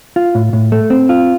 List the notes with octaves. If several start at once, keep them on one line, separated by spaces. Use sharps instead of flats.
F4
A2
A2
A3
C4
F4